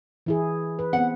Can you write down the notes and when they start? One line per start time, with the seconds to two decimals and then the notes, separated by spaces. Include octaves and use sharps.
0.26 E3 E4 G#4
0.79 B4
0.93 B3 C4 F#5